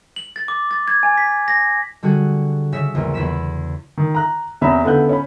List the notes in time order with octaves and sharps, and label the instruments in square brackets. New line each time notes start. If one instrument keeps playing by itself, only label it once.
[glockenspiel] F#7
A6
D6
A6
G#6
G#5
B6
A#6
[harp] D3 G3 F#4 G#4
C#3 E5 B6
A#1 E2
E2 B5 B6 E7
[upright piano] D#3
A#5 F#6
E2 C3 C#4 E5 A#5 B5
C#2 D3 B3 E4 F#6 G6
C#4 B5